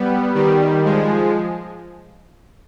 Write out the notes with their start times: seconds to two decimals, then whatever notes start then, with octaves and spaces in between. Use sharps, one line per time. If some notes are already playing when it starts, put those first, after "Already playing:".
Already playing: G3 B3
0.35 D#3 G3
0.85 F3 G#3